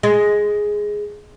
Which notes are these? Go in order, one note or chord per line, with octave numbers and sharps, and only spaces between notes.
G#3